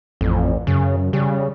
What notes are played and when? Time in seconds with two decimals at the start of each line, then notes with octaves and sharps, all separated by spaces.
0.21 A1 F2
0.67 F#2 C#3
1.13 C#3 G3